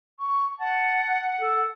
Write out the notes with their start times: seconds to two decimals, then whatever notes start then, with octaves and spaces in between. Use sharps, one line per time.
0.20 C#6
0.60 F#5 A5
1.41 A4